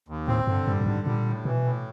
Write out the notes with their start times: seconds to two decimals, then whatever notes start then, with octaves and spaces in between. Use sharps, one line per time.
0.08 D#2
0.28 A2 C4
0.47 G2 D3
0.67 G2 G3
0.81 G2
0.86 G#2 D3
1.06 A#2 G3
1.26 A2
1.45 B2 E3
1.64 A2